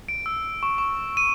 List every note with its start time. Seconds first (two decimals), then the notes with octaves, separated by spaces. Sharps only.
0.09 D7
0.26 E6
0.63 C#6
0.78 C#6
1.17 D#7